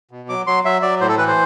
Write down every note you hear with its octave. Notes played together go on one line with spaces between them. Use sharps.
B2
F#3 D6
F#3 C6
F#3 E5
F#3 D5
A2 C5
A4
E3 B4
C5